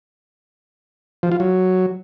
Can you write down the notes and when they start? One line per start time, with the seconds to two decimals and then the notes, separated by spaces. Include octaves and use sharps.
1.23 F3
1.32 F4
1.40 F#3